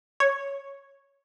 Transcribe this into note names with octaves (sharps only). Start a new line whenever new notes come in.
C#5